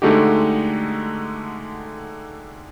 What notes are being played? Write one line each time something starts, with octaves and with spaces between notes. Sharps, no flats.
D3 G#3 A3 D#4 F#4 G4